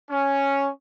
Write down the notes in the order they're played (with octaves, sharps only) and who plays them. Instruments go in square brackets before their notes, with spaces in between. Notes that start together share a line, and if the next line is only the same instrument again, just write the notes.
[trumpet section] C#4